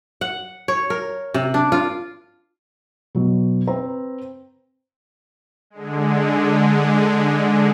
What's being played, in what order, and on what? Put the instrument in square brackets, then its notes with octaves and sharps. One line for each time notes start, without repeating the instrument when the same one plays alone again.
[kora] F#5
C#5
A#4
C3
D4
F4
[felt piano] B2 F#3
C4 B4 C5 A#5
[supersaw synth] D3 G#3